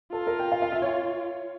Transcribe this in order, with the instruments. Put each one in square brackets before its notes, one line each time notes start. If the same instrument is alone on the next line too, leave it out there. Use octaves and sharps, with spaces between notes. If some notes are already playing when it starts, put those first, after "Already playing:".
[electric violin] F4 [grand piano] A4
[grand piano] A#4
G5
F5
F5
E5
C#5